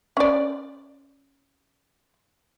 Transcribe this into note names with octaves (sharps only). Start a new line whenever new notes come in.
C#4 D5